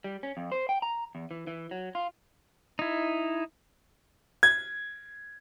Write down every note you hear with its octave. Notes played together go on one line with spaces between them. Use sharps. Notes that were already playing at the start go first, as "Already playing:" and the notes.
G3
C#4
F2
C5
G5
A#5
E2
E3
E3
F#3
F4
D#4 E4
G#6